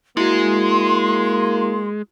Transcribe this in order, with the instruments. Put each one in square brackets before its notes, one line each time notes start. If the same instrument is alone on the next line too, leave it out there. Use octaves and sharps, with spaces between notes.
[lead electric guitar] G#3 [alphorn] A#3 [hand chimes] E4 F#4 [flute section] C6